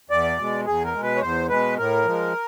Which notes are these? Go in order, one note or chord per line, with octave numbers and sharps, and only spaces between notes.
E2 D5
B2 G#3
E2 G#4
A#4
B2 G#3
B4
C#5
E2 C5
B2 G#3 B4
A2 A#4
F3 G#3